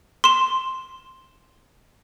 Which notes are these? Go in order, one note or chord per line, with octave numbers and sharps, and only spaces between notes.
C6 E7